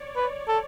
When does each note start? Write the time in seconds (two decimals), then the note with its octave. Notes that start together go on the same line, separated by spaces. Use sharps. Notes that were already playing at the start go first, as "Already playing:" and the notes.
Already playing: C#5 D5
0.16 B4
0.48 A4